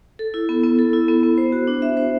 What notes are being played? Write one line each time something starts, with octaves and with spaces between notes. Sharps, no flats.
A4
E4
B3
B3
A4
E4
B3
B3
C5
F#4
D4
E5
C5